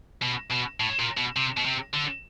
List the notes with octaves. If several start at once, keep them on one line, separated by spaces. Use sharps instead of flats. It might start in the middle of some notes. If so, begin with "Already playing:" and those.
B2
B2
A2
A#2
B2
C3
B2
C3
D3